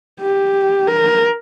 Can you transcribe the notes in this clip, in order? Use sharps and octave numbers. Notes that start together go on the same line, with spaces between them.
G4
A#4